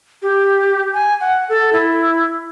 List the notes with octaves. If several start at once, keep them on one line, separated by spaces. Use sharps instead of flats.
G4
G#5
F#5
A4
E4